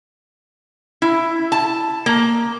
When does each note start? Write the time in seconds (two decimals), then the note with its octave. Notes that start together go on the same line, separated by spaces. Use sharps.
1.02 E4
1.52 A5
2.06 A#3